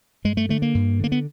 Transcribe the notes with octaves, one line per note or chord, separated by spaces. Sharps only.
G2 G#3
A3
D3 A3
A#3
G2
D3 A#3
B3